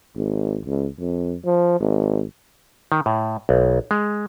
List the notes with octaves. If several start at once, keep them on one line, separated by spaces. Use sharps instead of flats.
G#1
C#2
F2
F3
G#1
D#3
A2
B1
G#3